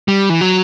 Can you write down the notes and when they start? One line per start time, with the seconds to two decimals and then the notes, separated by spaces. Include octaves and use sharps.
0.08 G3
0.30 E3
0.41 F#3